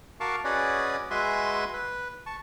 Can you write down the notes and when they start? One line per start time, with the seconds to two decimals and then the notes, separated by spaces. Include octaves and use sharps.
0.20 F#4 A#4 F5 A5 C#6 D6
0.44 C#4 F#4 G#4 B4 D5 D#5
1.11 G#3 F#4 B4 E5 G#5 C6
1.73 B4
2.26 A5 C#6